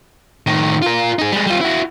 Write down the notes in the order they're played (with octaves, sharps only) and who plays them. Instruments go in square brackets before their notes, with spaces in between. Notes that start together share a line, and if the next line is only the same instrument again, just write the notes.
[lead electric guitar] A2 D#3
F4 A#4
D#4 G#4
G3 G#3
G3 F4
E4 F#4